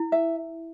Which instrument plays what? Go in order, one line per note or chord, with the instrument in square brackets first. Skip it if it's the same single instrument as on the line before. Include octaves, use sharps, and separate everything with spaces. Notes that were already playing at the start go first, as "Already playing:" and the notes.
Already playing: [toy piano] E4
[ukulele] E5